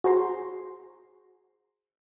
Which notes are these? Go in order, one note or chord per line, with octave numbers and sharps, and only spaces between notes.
F#4 G#4 C5 A#5 C6